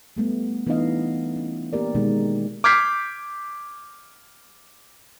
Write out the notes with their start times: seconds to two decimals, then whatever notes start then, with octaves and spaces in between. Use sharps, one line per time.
0.16 G3 A3 B3
0.67 E3 B3 D4 D#4 D#5 F5
1.36 C#4
1.73 A#3 B3 G4 A#4 D5
1.95 B2 D#3 G#3 D#4 G#4
2.64 D6 F6 G6 G#6 B6 C7